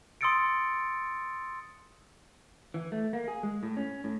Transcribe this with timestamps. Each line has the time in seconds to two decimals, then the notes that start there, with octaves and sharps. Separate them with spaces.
0.21 C6 D#6 E6 A6 C#7 D7
2.74 E3
2.92 A3
3.13 A#3
3.28 G#4
3.43 G#3
3.63 A2
3.77 C#4
4.04 A2